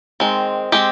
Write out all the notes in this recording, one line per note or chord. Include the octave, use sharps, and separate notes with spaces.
D#3 G#3 C4
G#3 C4 G4